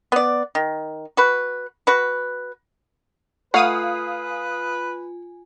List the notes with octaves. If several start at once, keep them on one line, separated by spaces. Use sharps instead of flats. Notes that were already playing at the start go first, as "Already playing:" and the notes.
B3 D5
D#3
F#4 B4
F#4 B4
A3 F4 B4 F5 F#5 G#5 D#6